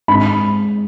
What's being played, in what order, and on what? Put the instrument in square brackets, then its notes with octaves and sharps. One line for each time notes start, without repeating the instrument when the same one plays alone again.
[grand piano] G#2 B5